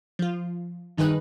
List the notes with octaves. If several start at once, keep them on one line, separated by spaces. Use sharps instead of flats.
F3 F4
G2 D#3 D#4 G#4 B4 F#6